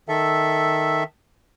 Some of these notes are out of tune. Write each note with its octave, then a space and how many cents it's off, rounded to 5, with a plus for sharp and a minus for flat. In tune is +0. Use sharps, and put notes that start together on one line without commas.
D#3 +0 A4 +0 E5 +0